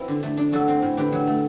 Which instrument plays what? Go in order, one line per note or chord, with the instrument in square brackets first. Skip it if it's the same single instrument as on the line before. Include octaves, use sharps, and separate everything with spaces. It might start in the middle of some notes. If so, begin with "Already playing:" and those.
Already playing: [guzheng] F#3 C4 E4 B4
D3
A3
D4
F#3 F#4 A4
C4
A2
D3 G4 B4
F#3
A3